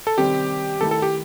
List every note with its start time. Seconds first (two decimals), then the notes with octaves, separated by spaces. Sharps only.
0.07 A4
0.18 C3 D#3 G3 C4 G4
0.81 D#3 A3 E4 A4
0.91 A4
1.02 G4